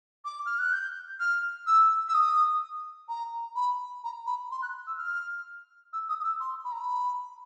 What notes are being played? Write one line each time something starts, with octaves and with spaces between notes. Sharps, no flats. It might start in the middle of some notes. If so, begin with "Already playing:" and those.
D6
F6
F#6
G6
F6
E6
E6
D#6
A#5
B5
A#5
B5
C6
F#6
E6
F6
E6
D#6
D#6
E6
C6
B5
A#5
B5